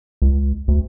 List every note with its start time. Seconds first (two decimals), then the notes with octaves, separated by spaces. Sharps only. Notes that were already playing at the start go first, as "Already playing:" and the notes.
0.22 C#2
0.68 D2